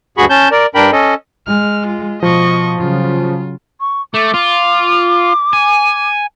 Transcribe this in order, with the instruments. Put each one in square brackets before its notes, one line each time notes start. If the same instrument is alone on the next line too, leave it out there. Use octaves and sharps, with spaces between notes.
[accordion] D2 G2 F#4 G#4 B5 C#6
C#4 A5 G6
A#4 D5
G2 D4 A#4 G5 B5
C#4 A4 D#5
[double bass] G#3 [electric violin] F6
[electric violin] F4
[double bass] B2 [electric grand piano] F3 [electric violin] D#5 C#6
[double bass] C#3 F#3 [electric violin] F4
[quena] C#6
[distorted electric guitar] A3 [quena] D6
[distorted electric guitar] F4
G#5